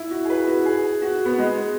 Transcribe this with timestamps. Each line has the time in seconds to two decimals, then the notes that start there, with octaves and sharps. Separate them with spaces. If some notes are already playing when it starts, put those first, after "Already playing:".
Already playing: E4
0.11 F#4
0.25 G#4
0.30 B4
0.48 F#4
0.66 G#4
1.02 F#4
1.25 B3
1.38 G#3